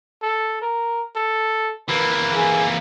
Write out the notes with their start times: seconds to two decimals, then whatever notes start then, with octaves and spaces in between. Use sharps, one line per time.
0.22 A4
0.62 A#4
1.16 A4
1.89 E3 A#3 B4
2.32 G#4